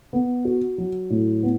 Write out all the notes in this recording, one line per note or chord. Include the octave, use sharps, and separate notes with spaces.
B3
F#4
F#3
A2
B3